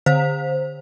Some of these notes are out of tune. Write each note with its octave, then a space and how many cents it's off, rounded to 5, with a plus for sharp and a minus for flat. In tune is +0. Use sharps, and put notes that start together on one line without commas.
D3 +0 C5 +0 F5 +30